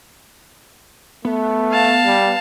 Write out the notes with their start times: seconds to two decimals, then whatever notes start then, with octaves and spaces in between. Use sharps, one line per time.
1.25 A3 B3
1.72 F5 A5
2.06 G3